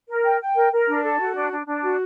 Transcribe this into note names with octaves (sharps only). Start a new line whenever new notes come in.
A#4
G5
G5
A#4
A#4
D4
A4
F#4
D4
D4
D4
F#4